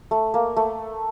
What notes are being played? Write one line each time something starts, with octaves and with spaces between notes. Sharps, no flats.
A3
A#3
A3